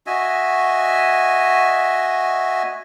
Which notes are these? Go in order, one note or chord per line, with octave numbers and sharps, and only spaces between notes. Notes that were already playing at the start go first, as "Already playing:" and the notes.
F#4 D#5 E5 G#5